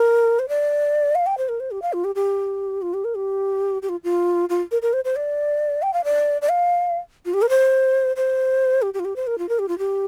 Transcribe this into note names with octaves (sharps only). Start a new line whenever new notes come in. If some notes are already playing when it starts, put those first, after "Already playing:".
Already playing: A#4
C5
D5
F5
G5
C5
A#4
C5
G4
F5
F4
G4
G4
F4
G4
A#4
G4
G4
F4
F4
F4
A#4
A#4
C5
C5
D5
G5
F5
D5
D5
F5
F4
G4
A#4
C5
C5
G4
G4
F4
G4
C5
A#4
F4
A#4
G4
F4
G4